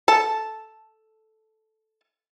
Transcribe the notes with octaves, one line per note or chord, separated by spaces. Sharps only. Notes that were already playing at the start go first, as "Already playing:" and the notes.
A4 A5